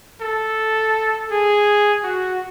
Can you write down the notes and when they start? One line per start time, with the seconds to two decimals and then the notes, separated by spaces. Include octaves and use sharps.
0.21 A4
1.31 G#4
2.03 F#4